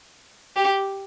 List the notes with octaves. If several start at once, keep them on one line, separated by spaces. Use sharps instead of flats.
G4